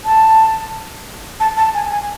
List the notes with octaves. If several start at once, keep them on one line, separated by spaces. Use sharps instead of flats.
A5
A5
A5
G#5
G#5